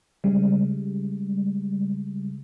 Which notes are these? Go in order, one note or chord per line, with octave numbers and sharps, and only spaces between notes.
C#3 G3 G#3